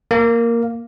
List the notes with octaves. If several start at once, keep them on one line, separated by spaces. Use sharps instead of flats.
A#3